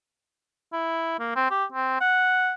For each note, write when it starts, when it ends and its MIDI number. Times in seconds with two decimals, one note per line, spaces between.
0.73 1.16 64
1.20 1.35 58
1.36 1.46 60
1.51 1.64 67
1.73 1.99 60
2.01 2.52 78